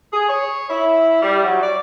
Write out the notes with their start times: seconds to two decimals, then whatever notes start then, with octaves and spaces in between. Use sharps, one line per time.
0.13 G#4
0.29 C#5
0.70 E4
1.22 G3
1.43 F#3
1.62 D5